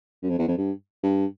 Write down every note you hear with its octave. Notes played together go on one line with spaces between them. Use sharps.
F#2
F2
E2
F2
G2
G2